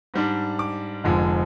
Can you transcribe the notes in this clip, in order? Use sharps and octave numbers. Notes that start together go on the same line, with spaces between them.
G#2 G3 D4
D6
F1 F2 D3 F3 G#3